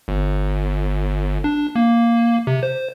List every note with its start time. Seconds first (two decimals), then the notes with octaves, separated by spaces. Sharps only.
0.08 G1
1.44 D4
1.76 A#3
2.47 C3
2.63 C5